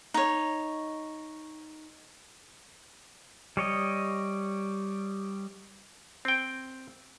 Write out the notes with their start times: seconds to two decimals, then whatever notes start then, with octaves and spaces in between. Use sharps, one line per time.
0.14 D#4 C#5
3.57 G3 C#5 D#5
6.25 C4 G5